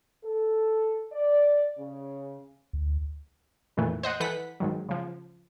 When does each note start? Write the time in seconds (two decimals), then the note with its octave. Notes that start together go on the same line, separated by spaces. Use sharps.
0.25 A4
1.12 D5
1.78 C#3
2.73 D2
3.77 F2 A#2 D#3 E3 A3
4.03 C5 D#5 F#5
4.20 E3 A4 B4 F#5 B6
4.60 G#2 D#3 F#3
4.89 C#3 F3